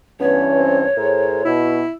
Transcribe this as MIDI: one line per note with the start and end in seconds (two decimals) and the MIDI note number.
0.21 0.85 43
0.21 0.85 52
0.21 0.45 59
0.21 0.85 61
0.21 1.51 73
0.59 0.83 60
0.97 1.41 45
0.97 1.42 68
0.97 1.42 70
0.97 1.42 72
1.45 1.82 47
1.45 1.92 64